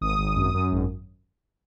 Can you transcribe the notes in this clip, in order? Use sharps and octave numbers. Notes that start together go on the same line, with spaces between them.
G#1 D#6
G#1
F#2
F#2
G#1